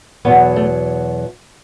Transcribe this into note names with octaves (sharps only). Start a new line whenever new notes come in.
E2 B2 F#3 B3
A3